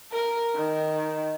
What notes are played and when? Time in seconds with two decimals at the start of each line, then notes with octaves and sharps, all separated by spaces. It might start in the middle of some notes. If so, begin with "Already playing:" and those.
0.12 A#4
0.56 D#3